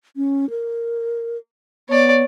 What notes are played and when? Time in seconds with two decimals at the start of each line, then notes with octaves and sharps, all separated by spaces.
0.16 C#4
0.50 A#4
1.89 B3 C#5 D5